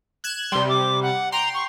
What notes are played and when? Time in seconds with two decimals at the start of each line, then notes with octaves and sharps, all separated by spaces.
0.24 F#6 G#6 E7
0.52 C3 G3 C6
0.69 D6
1.02 F#5
1.32 G5 A#5 C6
1.54 C#6